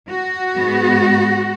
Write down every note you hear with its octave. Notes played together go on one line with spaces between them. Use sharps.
F#4
G#2 G#3 B3